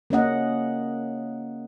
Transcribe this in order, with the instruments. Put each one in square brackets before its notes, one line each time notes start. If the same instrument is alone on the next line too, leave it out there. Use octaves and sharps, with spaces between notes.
[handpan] A#3 C#4 D#5 F#5